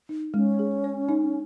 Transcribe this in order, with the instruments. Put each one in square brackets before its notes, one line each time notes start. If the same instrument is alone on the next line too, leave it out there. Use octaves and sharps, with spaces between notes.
[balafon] D#4
[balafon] G#3 [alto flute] C#4
[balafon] G#4
C#5
D#4